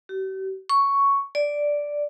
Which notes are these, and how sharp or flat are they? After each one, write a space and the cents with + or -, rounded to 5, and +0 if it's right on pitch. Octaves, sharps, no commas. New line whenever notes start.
G4 -45
C#6 +5
D5 -5